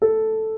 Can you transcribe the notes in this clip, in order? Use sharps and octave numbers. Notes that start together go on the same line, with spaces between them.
A4